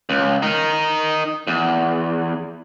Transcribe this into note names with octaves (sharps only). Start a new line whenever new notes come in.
C#2
D#4 A#4
E2